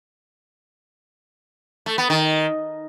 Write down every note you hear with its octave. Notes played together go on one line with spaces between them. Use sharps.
A3
B3
D#3